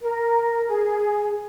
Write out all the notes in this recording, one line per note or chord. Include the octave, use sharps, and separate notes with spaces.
A#4
G#4